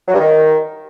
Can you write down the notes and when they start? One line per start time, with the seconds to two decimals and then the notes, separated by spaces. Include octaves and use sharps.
0.08 F#3
0.14 G2
0.20 D#3